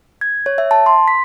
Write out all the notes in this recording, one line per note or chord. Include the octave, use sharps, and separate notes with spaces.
G#6
C#5
E5
A5
C6
B6